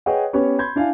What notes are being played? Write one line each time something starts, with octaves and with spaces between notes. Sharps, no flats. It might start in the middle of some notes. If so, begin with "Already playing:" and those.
G#4 B4 C#5 D#5 F#5 G5
B3 C#4 G4 B4 C#5
B5 C6 G6 G#6
D4 E4 F5 G#5